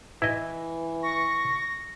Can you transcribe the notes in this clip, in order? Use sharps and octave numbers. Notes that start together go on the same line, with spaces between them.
E3 E4 D#5
C#6 A#6